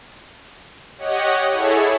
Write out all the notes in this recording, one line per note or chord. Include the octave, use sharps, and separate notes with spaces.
G4 C#5 D#5 F#5
E4 G#4 A4 C#5